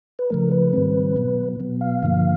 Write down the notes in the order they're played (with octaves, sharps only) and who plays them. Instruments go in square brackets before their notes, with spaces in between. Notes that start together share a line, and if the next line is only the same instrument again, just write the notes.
[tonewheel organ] B4
C#3 F3 A3 A#4
B4
G#2 D#3 G3 C4
B2 F#3 B3
B2 F#3 B3
F5
G2 D3 F3 A#3